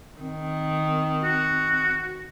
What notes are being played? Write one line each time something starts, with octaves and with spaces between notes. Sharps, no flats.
D#3 C4
F#4